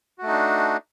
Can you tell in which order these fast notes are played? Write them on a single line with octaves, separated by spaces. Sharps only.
F#4 A3 D#4 D4